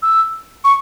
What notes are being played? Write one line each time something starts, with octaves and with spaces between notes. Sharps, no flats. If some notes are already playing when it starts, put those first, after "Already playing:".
E6
C#6